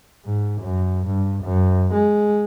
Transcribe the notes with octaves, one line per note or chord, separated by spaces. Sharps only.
G#2
F#2
G2
F#2
G#3